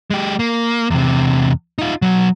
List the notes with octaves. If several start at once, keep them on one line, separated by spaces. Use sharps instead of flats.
G#3 G4
A#3
E2 C3
D#4 F4
B1 F#3